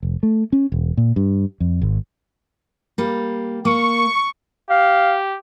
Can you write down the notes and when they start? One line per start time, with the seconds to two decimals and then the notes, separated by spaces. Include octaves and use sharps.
0.03 F1
0.23 A3
0.52 C#4
0.72 E1
0.97 A#2
1.16 G2
1.60 F2
1.82 G#1
2.98 G3 A#3
3.65 A#3 C#6
4.70 G4 F5